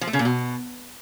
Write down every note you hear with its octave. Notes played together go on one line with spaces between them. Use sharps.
F3
A3
C#3
A#2
B2